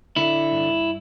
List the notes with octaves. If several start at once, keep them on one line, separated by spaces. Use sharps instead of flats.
D3 E4
G2